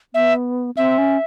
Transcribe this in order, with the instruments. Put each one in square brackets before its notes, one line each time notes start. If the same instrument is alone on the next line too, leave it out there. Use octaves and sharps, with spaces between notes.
[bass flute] B3 [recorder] E5
[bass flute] C4 [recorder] E5
[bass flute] C#4